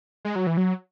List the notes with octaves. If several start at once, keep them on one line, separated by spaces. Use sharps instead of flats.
G#3
F#3
E3
F#3